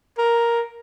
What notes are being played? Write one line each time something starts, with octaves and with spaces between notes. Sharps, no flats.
A#4